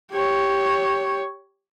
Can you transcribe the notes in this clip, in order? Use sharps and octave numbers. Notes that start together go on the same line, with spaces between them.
G4 C#5